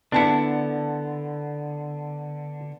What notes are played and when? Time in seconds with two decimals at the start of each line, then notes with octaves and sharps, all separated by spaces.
0.12 D3 B3 D4 E4 A5 C#7